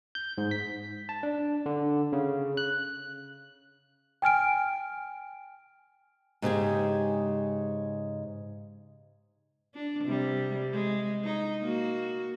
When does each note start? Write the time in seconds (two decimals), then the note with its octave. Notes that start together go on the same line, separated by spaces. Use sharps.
0.15 G6
0.38 G#2
0.51 B6
1.09 A5
1.23 D4
1.66 D3
2.13 C#3
2.57 F#6
4.22 G5 G#5 F6 D7
6.42 G#2 C#3 G4 G#4
9.74 D4
10.04 C3 G3
10.73 G#3
11.24 D#4
11.62 A#3 F#4